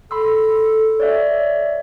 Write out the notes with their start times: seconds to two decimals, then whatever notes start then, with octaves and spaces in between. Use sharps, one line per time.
0.11 A4 B5 C6 E6
1.00 C#5 D5 E5